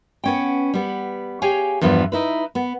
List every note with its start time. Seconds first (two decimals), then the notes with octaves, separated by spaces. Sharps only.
0.24 B3 C#4 G5
0.74 G3 B3
1.42 G4 G#4 C#5 F5 G5 G#5
1.81 E2 G2 F3 B3 B4
2.12 D#4 E4 B4
2.55 B3